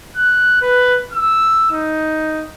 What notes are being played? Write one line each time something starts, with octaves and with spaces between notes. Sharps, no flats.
F#6
B4
E6
D#4